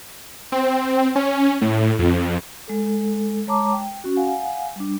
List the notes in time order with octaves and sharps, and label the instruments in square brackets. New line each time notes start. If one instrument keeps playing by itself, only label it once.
[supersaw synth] C4
C#4
A2
F2
[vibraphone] G#3 A4
G#3 C#5 A5 A#5 D6
G5
C#4 F#4
F5 F#5 G#5
G3 D4